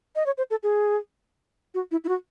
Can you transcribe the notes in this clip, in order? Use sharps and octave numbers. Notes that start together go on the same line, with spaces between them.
D#5
C#5
C5
A4
G#4
F#4
E4
E4
F#4